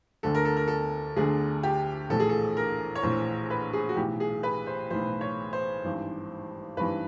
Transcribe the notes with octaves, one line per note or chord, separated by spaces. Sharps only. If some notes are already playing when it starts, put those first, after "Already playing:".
D2 D3 A4
A#4
A4
A#4
A4
D2 D3 G#4
G4
A#1 A2 E3 A4
G#4
A4
A#4
C#5
A#1 A2 E3 C5
B4
G#4
F#4
B1 A2 E3 G4
G#4
B4
C5
B1 A2 E3 C5
C#5
C5
G#1 G2 E3
G#1 G2 E3 B4